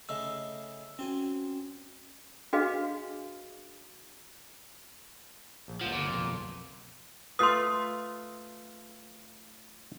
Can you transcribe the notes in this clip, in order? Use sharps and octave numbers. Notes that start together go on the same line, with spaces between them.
C#3 A3 D#4 E6
C4 C#4 F#4 G#5
D4 F#4 G#4 B4 D#5 F5
A#1
C#2 F3 A#3 F#5
G1 A#2
B1 F2
A3 F4 B4 C6 D#6